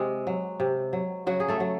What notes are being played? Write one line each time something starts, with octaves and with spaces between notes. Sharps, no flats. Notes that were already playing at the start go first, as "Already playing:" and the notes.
Already playing: C3 G#3
F#3
C3
F#3
C#3 F#3 F#4
G#4
A3 A4
F#3